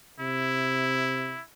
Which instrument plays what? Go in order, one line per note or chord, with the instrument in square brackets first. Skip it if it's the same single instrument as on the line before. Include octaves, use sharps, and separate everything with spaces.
[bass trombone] C3 [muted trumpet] E4